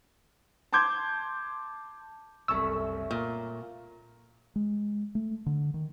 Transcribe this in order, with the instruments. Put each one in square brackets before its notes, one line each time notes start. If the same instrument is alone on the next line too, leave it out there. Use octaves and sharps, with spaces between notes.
[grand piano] A5 C6 D6 G6 G#6
[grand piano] F#1 C2 [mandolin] A3 C#4 [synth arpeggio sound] E6
[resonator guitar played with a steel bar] A#2 [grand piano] A#4
[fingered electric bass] G#3
A3
D3
D#3